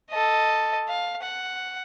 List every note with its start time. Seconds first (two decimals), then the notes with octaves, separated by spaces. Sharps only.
0.10 A4 D#5
0.88 F5
1.22 F#5